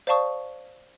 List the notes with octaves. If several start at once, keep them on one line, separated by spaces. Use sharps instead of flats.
C5 D5 F5 A5 C#6 D#6